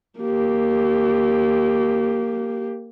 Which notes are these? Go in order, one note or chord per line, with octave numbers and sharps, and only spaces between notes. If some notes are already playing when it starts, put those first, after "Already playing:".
A#3 G4